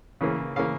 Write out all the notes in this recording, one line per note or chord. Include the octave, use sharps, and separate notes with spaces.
C#3 E3 A#3
C#3 E3 A#3 F5